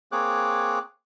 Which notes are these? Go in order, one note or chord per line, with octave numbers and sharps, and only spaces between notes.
A#3 C4 G#4 C#5 D6 F#6